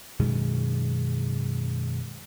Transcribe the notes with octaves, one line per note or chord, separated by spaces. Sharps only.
F#2 B2 D#3 G#3